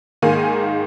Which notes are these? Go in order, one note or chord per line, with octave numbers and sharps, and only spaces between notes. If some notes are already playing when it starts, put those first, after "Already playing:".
G#2 D#3 A#3 G#5